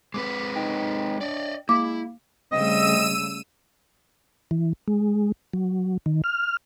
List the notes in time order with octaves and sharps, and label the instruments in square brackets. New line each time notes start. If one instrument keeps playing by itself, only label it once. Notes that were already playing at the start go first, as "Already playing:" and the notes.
[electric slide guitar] G#3 C4 B4 [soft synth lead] D6
[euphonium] D#4 [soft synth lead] G5
[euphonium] D4 [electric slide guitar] D5 D#5
[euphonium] G#3 [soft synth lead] A#3 [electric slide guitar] E4 [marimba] D6
[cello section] C#3 G3 A3 [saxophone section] C4 D#5 [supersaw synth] E6 D#7
[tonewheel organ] E3
G#3
F#3
D#3
F6